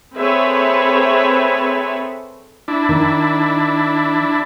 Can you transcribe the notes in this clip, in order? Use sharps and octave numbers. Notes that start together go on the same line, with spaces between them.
C4 G#4 A4 B4 C#5 E5
D4 E4
D#3